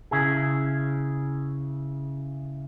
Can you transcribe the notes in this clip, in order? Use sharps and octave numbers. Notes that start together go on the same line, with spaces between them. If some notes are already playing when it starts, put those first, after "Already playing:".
C#3 E4 G#4